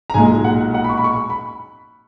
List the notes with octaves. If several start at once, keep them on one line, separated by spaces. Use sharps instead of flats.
A#5
B1 A#2 G#3 G#5
F#5
F#5
B5
C#6
B5
C#6
B5